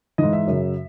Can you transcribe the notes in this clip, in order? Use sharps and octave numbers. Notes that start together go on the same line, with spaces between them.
G#2 E3 D#5
E5
F#2 C#3 F#3